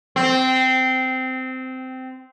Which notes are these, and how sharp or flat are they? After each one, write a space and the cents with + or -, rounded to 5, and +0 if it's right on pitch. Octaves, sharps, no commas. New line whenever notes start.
C4 -15